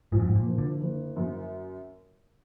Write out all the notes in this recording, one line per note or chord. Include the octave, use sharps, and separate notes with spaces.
G#2 F3
F#2
G#2
A#2
F#1
D3
F#1
F#2